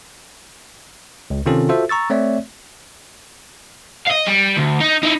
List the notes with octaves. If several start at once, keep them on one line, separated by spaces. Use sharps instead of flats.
C#2
C3 D#3 C4 C#4 F4 A4
F4 F#4 A4 C5 E5
A#5 C#6 E6 A6
A3 C4 C#5 D5 E5
D#5 F5
G3
D2
D#4
D#4 E4